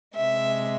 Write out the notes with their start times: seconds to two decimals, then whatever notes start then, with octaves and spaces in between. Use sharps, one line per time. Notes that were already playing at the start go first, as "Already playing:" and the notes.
0.16 C3 G#3 E5